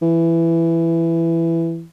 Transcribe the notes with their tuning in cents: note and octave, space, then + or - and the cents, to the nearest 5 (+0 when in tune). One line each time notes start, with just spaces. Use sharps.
E3 +10